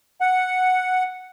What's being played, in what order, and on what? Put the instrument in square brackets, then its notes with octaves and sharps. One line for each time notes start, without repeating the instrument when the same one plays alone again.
[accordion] F#5